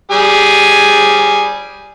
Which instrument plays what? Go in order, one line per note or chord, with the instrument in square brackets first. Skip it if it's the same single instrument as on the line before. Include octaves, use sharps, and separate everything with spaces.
[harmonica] G3 G#4 G#5